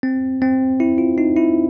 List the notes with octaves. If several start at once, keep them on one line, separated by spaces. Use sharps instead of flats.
C4
C4
E4
F4
D#4
E4